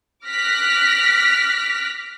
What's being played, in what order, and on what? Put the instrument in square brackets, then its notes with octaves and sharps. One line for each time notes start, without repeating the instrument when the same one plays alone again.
[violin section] D6 F6 F#6 A#6 B6